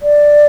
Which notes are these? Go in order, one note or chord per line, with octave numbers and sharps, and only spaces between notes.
D5